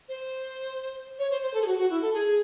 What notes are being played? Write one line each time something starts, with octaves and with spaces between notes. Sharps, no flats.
C5
C#5
C5
C5
A4
G#4
F#4
F#4
E4
A4
G#4